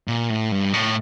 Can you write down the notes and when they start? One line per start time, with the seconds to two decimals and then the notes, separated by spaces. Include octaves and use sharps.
0.08 A#2
0.30 A2
0.51 G2
0.74 A2